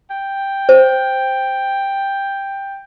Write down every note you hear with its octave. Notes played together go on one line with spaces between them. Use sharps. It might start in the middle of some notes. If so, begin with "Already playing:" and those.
G5
C5